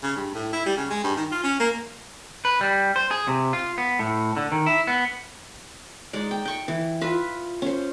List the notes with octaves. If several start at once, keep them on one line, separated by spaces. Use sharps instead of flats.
C#3
G2
A2
E4
G3
C#3
G#3
G2
D#3
F4
C#4
A#3
B4
G3
C5
G#4
C3
F4
B3
A2
D3
D#3
E4
B3
G#3 D#4 D5
G5
G5 C#6
E3
F4 B4 E5
C#4 C5